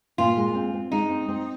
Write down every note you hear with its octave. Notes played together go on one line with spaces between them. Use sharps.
A#2 F4
G#3
C4
C4
G#3 D#4
C4
C4